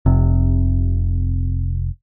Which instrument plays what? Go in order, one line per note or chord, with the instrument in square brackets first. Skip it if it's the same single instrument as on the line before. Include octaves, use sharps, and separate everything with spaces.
[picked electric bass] F1 C3